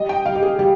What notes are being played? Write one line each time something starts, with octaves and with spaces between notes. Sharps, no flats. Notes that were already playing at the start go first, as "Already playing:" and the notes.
Already playing: G3 D#5
G5
G3 F5
G4
G#4
G3 G4